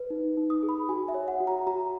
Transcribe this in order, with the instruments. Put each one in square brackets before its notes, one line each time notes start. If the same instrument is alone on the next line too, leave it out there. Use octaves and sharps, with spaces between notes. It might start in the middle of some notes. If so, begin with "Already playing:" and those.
Already playing: [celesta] B4
D#4
D#4
D#6
G#4
B5
F#4 G#5
E5
C#5
F#5
F#4
A#5
F#4 A#5